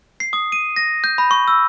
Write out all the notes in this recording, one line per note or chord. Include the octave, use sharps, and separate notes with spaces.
C7
D#6
D#7
A#6
G6
B5
C#6
E6